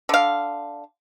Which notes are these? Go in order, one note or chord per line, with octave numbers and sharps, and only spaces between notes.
D3 F5